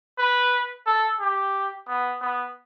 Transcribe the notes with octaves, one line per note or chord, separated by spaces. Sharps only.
B4
A4
G4
B3
B3